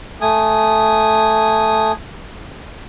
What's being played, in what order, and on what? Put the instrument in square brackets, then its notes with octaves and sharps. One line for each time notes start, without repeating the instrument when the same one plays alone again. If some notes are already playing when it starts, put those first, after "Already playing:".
[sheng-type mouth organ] A3 G#5 D#6